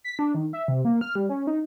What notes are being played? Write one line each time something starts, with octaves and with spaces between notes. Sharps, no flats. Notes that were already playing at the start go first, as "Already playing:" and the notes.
B6
D4
D#3
E5
C3
A#3
F6
G3
C#4
D#4